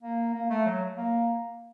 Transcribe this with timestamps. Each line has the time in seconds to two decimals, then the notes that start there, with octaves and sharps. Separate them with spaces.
0.02 A#3
0.34 A#3
0.50 A3
0.66 F#3
0.97 A#3